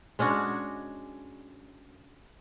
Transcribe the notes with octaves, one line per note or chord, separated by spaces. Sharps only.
G#3 C#4 D4 F#4